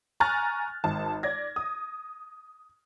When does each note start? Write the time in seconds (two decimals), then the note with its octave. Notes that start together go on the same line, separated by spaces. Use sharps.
0.20 G#5 A#5 C#6 F6 F#6 A6
0.84 G#1 A5
1.23 D5 G#6 A#6
1.56 D#6